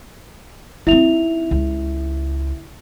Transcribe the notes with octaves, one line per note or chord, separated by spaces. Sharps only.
C4 D#4 E4 E5 F7
C#2